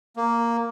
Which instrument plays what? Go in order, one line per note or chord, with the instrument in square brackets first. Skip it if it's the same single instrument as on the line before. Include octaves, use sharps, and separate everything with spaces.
[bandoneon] A#3